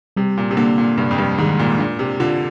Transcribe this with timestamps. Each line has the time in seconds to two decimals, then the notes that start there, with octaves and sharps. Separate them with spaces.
0.17 C3 G3
0.38 A#2
0.51 C3
0.57 D3 A#3
0.78 A#2
0.98 G2 C3
1.11 F2
1.18 G2
1.38 G#2 D#3
1.59 A#2
1.79 A#2 D4
1.99 C3
2.20 D3 F4